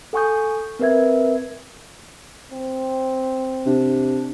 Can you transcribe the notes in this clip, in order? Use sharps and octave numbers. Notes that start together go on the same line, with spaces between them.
A4 F#5 G#5 C#6 D#6 G6
C4 A#4 B4 E5 G#6
C4
C3 D4